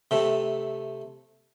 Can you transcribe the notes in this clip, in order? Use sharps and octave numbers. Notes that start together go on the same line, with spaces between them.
C3 A3